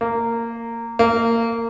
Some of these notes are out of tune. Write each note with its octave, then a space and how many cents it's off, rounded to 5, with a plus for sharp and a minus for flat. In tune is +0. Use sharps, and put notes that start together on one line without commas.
A#3 -15
A#3 -20